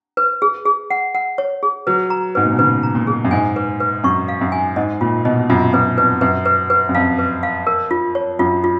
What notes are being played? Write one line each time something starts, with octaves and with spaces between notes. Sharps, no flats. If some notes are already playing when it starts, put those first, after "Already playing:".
B4
G#4
G#4
F#5
F#5
C#5
G#4
F#3 B4
A#5
G#2 B4
A#2
B2
C#3 B4
A#5
A#2
G#4
F#2
G#2 G#5
B4
B4
F#2 C#6
F5
F#2
G#5
G#2 D#5
A#2 F4
B2 D#5
F#2 F4
F#2 B4
F2 B4
F#2 B4
B4
B4
F#2
F2 F5
B4
F5
A#4
F4
C#5
F#2 F4
F4